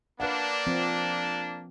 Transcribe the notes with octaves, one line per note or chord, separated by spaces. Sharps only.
A#3 D4 B4 F5 F#5
F3 C4